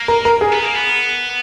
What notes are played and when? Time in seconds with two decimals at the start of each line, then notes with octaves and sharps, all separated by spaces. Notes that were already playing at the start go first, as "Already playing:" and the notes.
Already playing: A#3
0.08 A#4
0.25 A#4
0.41 G#4
0.53 B3
0.64 A#3
0.75 B3